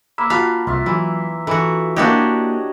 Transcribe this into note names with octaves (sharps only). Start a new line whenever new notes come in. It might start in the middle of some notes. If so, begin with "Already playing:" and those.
A#3 B5 E6
F4 F#4 F5 A5 B5
C2 F4 E5
E3 F#3
E3 F#4 A4
A#3 D4 E4 F#4 G4 C#5 D#5 F#5